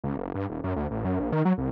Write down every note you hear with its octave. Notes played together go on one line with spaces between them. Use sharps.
C#2
F#1
G2
D#1
F#2
D2
A1
F#2
A#1
D#3
F#3
C2